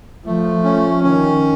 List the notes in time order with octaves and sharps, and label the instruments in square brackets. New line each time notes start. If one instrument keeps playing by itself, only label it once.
[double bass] F3 [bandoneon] A3
[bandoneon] C#4
[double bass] D#3 [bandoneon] C#4